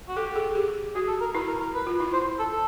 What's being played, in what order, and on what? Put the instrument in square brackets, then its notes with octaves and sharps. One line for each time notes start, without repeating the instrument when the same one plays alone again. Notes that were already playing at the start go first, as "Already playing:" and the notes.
[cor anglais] F#4
[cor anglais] G4 [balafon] A4
[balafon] G#4
G4
[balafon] F#4 [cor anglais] G#4
[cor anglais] A4
A#4
[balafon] E4 [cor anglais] B4
[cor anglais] A#4
A#4
B4
[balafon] F4
E4
[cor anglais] C5
A4
A4